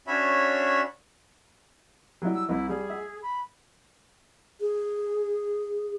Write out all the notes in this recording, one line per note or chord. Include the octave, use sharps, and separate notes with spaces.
C#4 D4 F#4 C#5 E5 B5
F#3 G3 E4
E6
C2 E4
G3 G#4
E5
B5
G#4